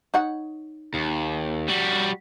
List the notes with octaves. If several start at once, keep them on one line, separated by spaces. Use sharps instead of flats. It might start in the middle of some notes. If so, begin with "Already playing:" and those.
D#4 C#5 F#5
D#2
G3 F#4